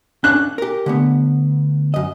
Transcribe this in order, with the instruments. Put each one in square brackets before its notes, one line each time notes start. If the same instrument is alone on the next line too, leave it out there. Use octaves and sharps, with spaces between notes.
[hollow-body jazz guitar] C#4 D4 F5 [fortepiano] F#6
[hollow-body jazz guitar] G4 A#4
D3 A3 B3
F#2 D#5